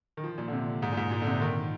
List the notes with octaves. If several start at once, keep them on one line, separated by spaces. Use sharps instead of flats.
D#3
F3
A#2
D3
C3
G#2
A#2
G#2
A#2
D3
C3
D#3